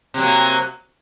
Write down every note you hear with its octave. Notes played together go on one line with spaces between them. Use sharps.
C3 F#3 A#3